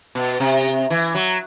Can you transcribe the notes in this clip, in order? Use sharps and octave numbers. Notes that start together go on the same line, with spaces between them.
B2
C3
E3
F#3